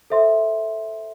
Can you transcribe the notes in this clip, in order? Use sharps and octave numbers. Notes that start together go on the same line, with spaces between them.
A4 C5 E5 C6